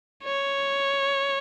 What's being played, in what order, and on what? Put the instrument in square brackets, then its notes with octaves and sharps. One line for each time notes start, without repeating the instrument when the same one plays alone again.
[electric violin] C#5